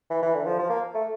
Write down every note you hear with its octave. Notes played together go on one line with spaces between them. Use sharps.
E3
E3
D3
F3
F3
A#3
A3